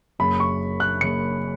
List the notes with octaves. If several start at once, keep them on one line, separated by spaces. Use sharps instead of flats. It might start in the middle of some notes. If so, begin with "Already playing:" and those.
F#1 F#2 C#3 B5
C#6
F#6
F#1 F#2 C#3 C#7